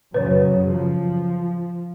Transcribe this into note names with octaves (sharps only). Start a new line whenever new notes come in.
F#2 C#3 F#3 B4 C#5
F3